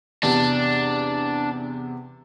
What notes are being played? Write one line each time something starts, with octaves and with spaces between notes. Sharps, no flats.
E2 C3 D4